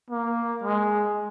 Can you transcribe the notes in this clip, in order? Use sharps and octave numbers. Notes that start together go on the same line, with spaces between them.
A#3
G#3